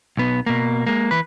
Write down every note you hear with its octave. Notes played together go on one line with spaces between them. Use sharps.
B1 B3
B2 A#3
G#3 A#3
E3 B4